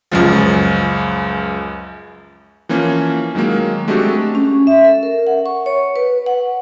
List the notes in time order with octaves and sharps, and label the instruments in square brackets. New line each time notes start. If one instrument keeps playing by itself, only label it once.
[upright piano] C#2 F#2 F3
[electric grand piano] E3 F3 A#3 C#4
D#3 F#3 G#3 A#3
G#3 A3 C4 D4 F#4 G4
[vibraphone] C#4
E5
A4
A#4
F#5
C#6
C#5
B4
F#5